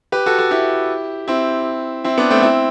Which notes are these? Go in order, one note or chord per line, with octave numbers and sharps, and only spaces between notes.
G4 B4
F#4 A4
F#4 A4
E4 G4
C4 E4
C4 E4
B3 D4
A3 C4
C4 E4